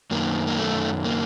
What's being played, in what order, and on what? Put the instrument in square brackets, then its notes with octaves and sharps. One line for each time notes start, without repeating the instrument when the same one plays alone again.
[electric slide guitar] F#2 D#3 A#3
A#3
A3
A#3